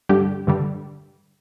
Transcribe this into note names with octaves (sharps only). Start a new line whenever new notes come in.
G2 D3 G3 G4
G2 D3 G3